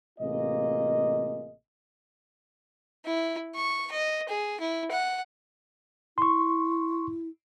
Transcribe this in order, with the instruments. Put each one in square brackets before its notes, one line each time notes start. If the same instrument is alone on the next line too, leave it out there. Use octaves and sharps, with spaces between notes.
[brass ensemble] A1 C3 A#3 F4 G#4 D#5
[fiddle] E4
C#6
D#5
G#4
E4
F#5
[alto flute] E4 [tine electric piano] C6 C#6